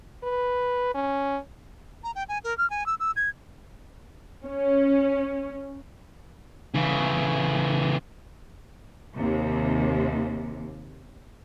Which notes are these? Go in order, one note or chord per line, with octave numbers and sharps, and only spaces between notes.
B4
C#4
A#5
G5
G#5
A#4
F6
G#5
E6
E6
G#6
C#4
C#3 E3
D#2 C3